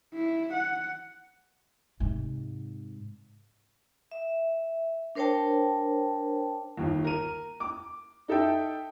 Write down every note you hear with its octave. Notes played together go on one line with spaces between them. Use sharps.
E4
F#5
G#2 C3
E5
D4 A#4 C5 C#5 G5 A5
G1 D#2
A#4 D#7
D6
D#4 A4 E5 G5